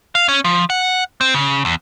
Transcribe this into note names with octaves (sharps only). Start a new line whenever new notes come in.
F5
C#4
F3
F#5
C4
C#3
E2